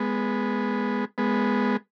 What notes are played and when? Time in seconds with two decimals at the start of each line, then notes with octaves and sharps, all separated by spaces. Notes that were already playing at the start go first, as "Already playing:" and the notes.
Already playing: G#3 B3
1.18 G#3 B3